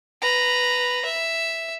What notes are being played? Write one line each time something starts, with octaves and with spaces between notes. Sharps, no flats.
B4 A#5
E5